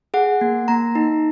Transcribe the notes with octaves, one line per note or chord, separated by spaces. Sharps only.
G#4 F#5
A#3
A#3 A#5
D#4